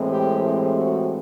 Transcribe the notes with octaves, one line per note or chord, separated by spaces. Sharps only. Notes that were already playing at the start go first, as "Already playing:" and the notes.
Already playing: A2 E3 G#3 C4
G4
G4
F#4